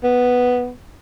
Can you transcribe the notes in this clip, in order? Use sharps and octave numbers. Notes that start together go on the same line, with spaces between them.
B3